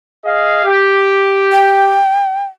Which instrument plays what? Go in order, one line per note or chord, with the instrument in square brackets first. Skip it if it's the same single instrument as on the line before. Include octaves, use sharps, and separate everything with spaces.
[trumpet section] G#4 D#5 F5
G4
[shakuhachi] G5